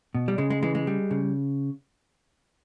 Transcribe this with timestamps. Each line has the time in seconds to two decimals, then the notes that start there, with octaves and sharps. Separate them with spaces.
0.15 B2
0.28 G3
0.38 C#3 G#3
0.50 G#3
0.62 E3 G#3
0.75 G#3
0.87 G3
1.11 C#3